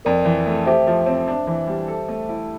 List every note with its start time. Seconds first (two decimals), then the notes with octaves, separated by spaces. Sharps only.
0.05 F2 A#4 D5
0.25 E3
0.47 A3
0.66 G4 C5 E5
0.87 F3
1.06 C4
1.28 D4
1.47 E3
1.67 G3
1.88 A4
2.09 A3
2.29 E4